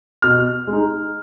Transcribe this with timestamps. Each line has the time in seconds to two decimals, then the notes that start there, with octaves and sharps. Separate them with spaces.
0.22 B2 F6
0.67 G#3
0.73 D#4